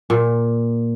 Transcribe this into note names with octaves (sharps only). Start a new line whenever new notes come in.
A#2